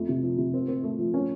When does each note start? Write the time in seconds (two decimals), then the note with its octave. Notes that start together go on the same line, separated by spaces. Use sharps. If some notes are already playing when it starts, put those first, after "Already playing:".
Already playing: F2 A3
0.09 C3
0.23 F3
0.38 C3
0.54 C4
0.68 C4
0.83 A3
0.99 F3
1.14 C#4